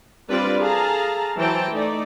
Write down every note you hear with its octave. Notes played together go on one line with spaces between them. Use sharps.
G3 C4 D4 F4 B4 D5
G#4 A4 F5 A5 A#5
E3 F#3 C5 G5 A5 A#5
A3 D#4 D5